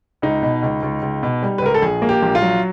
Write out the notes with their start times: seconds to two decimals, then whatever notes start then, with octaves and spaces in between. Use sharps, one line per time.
0.22 C#2 D#4
0.43 B2
0.63 C#2
0.83 C#2
1.02 C#2
1.23 B2
1.43 G3
1.58 B4
1.62 C#2 A#4
1.74 A4
1.82 A#1 G#4
2.02 A#3
2.09 G4
2.22 A#1
2.35 F4
2.42 F#3